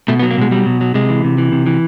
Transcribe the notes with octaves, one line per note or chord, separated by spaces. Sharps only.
B2 A3
B3
F#3
A#3
B2 G#3
F#3 G3
B2
F#3
C3 G#3
E3
C3
E3
C3
E3